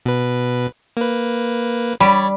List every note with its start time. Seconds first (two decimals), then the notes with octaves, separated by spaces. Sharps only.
0.06 B2 B4
0.97 A#3 B4
2.00 G3 C#5 D5 B5